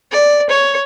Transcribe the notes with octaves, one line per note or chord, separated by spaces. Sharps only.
D5
C#5